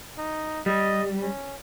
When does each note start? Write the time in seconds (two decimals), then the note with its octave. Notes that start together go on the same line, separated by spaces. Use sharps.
0.17 D#4
0.66 G3 D#5
1.21 C#4